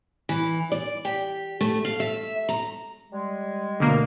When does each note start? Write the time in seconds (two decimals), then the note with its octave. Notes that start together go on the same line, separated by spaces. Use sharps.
0.29 E3
0.72 D5
1.05 G4
1.61 A3
1.85 F5
2.00 E5
2.49 A#5
3.13 G3 G#3
3.80 D2 B2 A#3